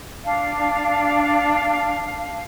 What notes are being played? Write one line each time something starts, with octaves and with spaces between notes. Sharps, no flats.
D4 F5